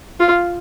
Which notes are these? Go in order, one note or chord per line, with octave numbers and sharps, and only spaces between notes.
F4